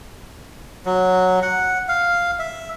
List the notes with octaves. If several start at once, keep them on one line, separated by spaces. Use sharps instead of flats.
F#3
F#5
F5
E5